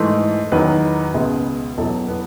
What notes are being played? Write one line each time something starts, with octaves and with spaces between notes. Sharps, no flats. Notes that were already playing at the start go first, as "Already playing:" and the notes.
Already playing: G#2 E3 A3
E2 D#3 F#3 B4
C#2 B2 G#3
E2 B2 F#3 A4
B3